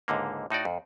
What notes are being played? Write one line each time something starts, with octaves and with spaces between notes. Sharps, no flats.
C#2 G#2 D3 A#3
A2 D#4 F#4 D5
F2